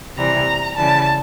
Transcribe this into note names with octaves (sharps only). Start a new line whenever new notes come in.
C3 E3 G3 A#5
C#3 E3 G3 A5